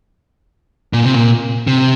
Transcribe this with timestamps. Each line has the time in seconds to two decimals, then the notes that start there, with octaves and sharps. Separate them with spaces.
0.93 A#2
1.04 C3
1.13 A#2
1.67 C3